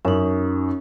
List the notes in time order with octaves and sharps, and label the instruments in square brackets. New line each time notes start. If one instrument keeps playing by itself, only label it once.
[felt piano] F#2 [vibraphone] C#4 D#4